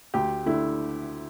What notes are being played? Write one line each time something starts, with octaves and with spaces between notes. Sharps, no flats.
D2 G4
D3 A3 E4